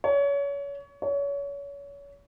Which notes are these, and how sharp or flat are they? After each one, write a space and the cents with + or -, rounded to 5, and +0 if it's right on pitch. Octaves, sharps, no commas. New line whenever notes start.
C#5 +30
C#5 +30